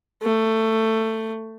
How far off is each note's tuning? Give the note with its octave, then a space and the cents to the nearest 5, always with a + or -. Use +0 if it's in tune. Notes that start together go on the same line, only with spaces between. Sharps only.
A3 +15